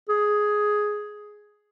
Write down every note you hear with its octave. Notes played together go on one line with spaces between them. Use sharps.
G#4